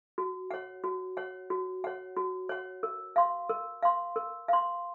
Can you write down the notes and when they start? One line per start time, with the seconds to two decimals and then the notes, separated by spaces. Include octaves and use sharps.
0.18 F#4
0.51 C#5 F#5
0.84 F#4
1.17 C#5 F#5
1.50 F#4
1.84 C#5 F#5
2.16 F#4
2.49 C#5 F#5
2.83 A#4
3.16 F5 C6
3.49 A#4
3.83 F5 C6
4.16 A#4
4.48 F5 C6